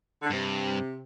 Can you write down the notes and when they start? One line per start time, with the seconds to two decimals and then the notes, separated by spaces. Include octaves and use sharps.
0.22 D3
0.30 G2 C3